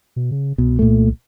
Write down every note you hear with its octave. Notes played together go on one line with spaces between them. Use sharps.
B2
C#3
C2 B2
A#2 A3